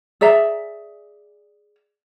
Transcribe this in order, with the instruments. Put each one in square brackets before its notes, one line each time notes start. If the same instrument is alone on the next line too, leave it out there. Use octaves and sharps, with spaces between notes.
[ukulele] G#4 D5 E5 A#5